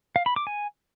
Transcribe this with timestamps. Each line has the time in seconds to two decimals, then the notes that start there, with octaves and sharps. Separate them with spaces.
0.16 F5
0.26 B5
0.36 D6
0.47 G#5